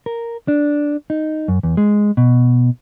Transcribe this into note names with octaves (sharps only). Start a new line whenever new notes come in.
A#4
D4
D#4
F#2
E2
G#3
B2